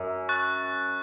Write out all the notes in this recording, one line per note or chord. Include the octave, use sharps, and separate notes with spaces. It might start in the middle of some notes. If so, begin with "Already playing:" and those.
Already playing: F#2
C#6 F#6 A6